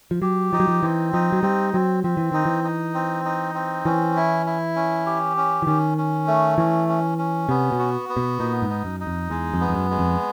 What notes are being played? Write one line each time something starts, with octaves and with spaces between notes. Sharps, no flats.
F3
F#3 G4
F3 D#4
F#3
F3
E3 C4
F3 D#4
F#3
G3 C4
F#3 C4
F3 C4
E3
D#3 D#4
E3
D#4
C4
D#4
C4
E3 C#4
E4
E4
C#4
G4
C#4
E3
D#3 C#4
C#4
A3
E3 C#4
C#4
C#4
C3 B3
B2
F#4
B3
B2
A#2 D#4
G#2
D#4
F#2
D#4
F2
E2 G#3
F2
B3
F2
F#2
G#3
F2